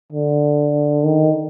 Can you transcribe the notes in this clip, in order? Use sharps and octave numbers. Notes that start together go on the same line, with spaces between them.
D3
D#3